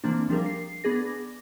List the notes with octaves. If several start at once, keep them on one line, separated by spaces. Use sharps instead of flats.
E3 A3 A#3 C4 D4
F3 G3 D4 G4 G#4 A#4
C7
B3 D4 G#4 A#6